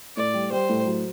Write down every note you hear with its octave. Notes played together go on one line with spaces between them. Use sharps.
A2 D5
G3
G3 C5
A2
F#3